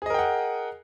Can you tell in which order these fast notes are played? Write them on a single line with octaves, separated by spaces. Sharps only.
G#4 D#5 A#4 G5 F#5